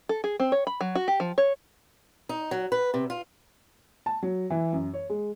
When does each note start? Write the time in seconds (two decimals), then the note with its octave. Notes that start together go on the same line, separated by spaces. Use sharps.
0.09 A4
0.24 G#4
0.40 C4
0.52 C#5
0.67 B5
0.81 F#3
0.95 F#4
1.08 G4
1.20 F3
1.38 C#5
2.29 D#4
2.51 F#3
2.72 B4
2.94 C3
3.10 F4
4.06 A5
4.23 F#3
4.50 E3
4.73 F#2
4.94 C#5
5.10 G#3